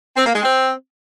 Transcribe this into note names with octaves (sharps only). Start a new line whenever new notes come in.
C4
A#3
G#3
C4